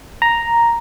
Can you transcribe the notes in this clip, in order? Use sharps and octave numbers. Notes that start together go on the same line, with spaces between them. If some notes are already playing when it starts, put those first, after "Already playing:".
A#5